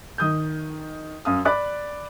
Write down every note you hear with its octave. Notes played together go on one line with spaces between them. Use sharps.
D#3 D#6 G6
F#2 F5 D#6
D5 B5 D6 F#6